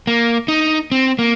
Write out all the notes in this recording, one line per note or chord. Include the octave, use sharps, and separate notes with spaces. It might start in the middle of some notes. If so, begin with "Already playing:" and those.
A#3
D#4
C4
A#3